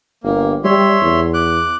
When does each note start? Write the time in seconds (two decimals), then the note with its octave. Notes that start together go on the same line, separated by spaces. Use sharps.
0.23 G1 A#3
0.64 G3 C#5 E5 C6
1.02 E2
1.34 D6 F#6